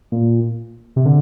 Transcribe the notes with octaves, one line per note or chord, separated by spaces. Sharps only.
A#2
C3
D3